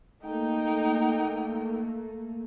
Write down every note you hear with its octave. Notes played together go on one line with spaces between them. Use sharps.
A3 A#3 D#4 G5